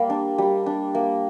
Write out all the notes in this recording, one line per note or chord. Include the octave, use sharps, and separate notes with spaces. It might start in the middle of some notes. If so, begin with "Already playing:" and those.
Already playing: G3 A#3
D4
G3
D4
A#3